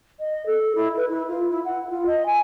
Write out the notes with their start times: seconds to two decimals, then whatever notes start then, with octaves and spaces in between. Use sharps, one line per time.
0.19 D#5
0.46 A4
0.75 E4
0.96 B4
1.08 E4
1.27 F4
1.49 E4
1.64 F#5
1.89 F4
2.05 D#5
2.26 G#5